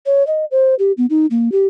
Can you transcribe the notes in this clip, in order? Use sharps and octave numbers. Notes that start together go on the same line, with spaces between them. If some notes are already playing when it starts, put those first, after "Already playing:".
C#5
D#5
C5
G4
B3
D#4
A#3
G4